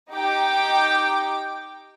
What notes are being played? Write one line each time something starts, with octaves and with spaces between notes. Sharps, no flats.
D#4 G4 G5 D6